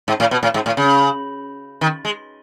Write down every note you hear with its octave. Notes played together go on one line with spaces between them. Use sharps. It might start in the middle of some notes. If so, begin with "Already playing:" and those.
G#2
A2
B2
A2
G#2
A2
C#3
D#3
G#3